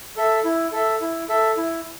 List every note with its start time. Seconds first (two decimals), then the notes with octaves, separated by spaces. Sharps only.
0.17 A4 E5
0.44 E4
0.73 A4 E5
1.01 E4
1.29 A4 E5
1.57 E4